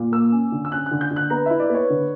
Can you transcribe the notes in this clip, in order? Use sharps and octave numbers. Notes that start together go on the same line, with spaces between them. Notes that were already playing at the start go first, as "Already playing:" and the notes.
Already playing: A#2
A#3 E6
C#4
D3
E6
C#4 F#6
F#6
D3
G6
D3
F#6
B3 A#5
E4 E5
D5
B3 C#5
D3